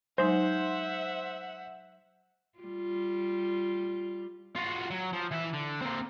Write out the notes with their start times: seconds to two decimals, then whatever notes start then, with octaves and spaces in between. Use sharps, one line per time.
0.18 F#3 G#3 D#4 C5 E5 F#5
2.59 G3 F4
4.55 F4 F#4
4.90 F#3
5.13 F3
5.32 E3 E5
5.54 D3
5.82 A#3 C4